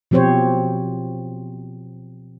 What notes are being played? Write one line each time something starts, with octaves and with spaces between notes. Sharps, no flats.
B2 F3 C4 G4 C5 C#5